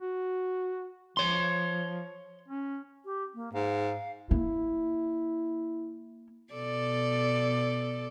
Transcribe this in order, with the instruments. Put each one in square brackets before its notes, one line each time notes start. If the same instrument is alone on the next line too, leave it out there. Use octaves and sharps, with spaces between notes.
[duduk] F#4
[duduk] F3 [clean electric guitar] C#5 C6
[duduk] C#4
[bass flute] G4
A#3
[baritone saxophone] G#2 [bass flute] F5
[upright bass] A#3 [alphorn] E4
[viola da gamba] B2 A4 D5